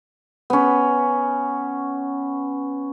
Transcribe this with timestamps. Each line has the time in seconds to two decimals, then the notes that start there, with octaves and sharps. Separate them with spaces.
0.50 B3 C#4